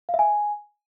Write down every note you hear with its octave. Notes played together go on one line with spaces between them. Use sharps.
F5
E5
G#5